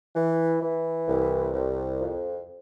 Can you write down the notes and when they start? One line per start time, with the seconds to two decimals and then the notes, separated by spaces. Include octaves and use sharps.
0.15 E3
0.61 E3
1.07 C2
1.53 C2
1.99 F2